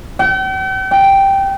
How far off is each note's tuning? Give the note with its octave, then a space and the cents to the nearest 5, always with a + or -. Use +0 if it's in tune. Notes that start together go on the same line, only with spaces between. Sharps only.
G5 -45
G5 +0